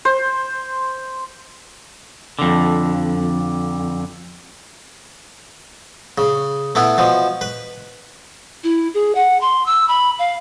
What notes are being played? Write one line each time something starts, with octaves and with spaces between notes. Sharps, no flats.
C5
F2 D3
C#3
A3 B3 E4
B2 F3
B4
E4
G#4
F#5
C6
E6
B5
F5